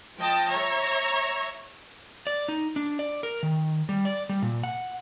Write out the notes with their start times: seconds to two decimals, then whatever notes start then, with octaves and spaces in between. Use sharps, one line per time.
0.18 F3 D#5 G5 A5
0.52 C#5 E5 A#5
2.27 D5
2.48 D#4
2.76 D4
2.99 D5
3.23 A#4
3.43 D#3
3.89 G3
4.05 D5
4.29 G3
4.42 A#2
4.63 F#5